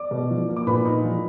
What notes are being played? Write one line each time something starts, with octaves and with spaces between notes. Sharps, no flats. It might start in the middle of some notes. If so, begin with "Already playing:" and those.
Already playing: D5 D6
B2
F3
A#3
D6
A#2 B4 B5
D#4
F3